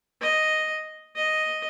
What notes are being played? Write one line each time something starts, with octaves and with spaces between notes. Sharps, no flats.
D#5
D#5